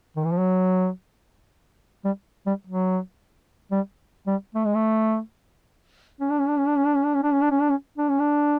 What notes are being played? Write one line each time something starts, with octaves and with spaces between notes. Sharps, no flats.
D#3
E3
F3
F#3
G3
G3
F#3
G3
G3
A3
G#3
A3
C#4
D4
C#4
D4
C#4
D4
C#4
D4
C#4
D4
C#4
D4
C#4
D4
C#4
D4
C#4
D4
C#4
D4